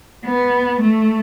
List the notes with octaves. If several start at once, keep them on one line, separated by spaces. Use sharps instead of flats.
B3
A3